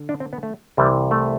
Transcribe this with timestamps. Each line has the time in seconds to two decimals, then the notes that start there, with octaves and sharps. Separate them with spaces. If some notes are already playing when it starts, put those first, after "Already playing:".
Already playing: D3
0.09 D4
0.20 C4
0.33 B3
0.43 A3
0.77 C2 C3 E3 G3
1.11 A3